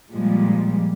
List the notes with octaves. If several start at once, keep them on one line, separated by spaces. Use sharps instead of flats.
A#2 F3 G3 G#3